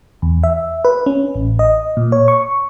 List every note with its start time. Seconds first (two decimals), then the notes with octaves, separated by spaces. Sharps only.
0.22 E2
0.43 E5
0.85 B4
1.06 C#4
1.35 A1
1.59 D#5
1.97 A#2
2.12 C#5
2.28 C#6